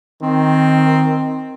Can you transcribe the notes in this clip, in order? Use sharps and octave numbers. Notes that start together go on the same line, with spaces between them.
D#3 C4